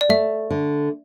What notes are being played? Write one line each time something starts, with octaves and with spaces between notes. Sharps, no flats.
D5
A3 E5
D3